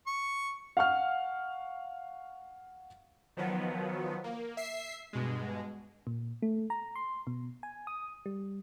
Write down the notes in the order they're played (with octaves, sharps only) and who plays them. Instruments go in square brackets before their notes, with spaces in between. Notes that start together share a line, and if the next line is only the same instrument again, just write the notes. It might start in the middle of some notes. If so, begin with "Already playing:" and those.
[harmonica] C#6
[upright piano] F5 F#5 C#6 F6
[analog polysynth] D#3 F3 F#3 B3
A#3
E5 C7
G2 B2 G#3
[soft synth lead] A#2
A3
A#5
C6
B2
G#5
D#6
G3